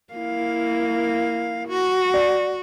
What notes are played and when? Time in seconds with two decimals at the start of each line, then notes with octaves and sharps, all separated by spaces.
0.13 A#3 E4 F5
1.68 F#4
2.14 D5